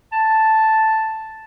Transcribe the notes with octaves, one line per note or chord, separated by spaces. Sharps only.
A5